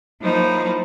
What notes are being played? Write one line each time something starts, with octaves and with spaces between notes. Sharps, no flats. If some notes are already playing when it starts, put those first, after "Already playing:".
F3 F#3 A#3 D#4 E4 C5